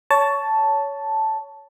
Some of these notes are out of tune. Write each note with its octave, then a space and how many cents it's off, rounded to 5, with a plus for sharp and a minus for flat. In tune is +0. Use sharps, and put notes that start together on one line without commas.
C#5 +15 A5 +0